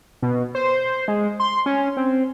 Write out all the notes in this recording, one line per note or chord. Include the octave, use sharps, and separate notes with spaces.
B2
C5
G#3
C6
C#4
C4